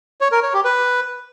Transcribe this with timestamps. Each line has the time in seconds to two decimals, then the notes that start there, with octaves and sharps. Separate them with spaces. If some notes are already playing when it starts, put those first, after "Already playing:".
0.21 C#5
0.32 A#4
0.43 C#5
0.54 G4
0.65 B4